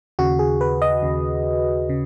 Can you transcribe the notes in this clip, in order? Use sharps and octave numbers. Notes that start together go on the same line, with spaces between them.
D#2 C#3 F#4
G#4
B4
D#5
D#2 C#3
C#3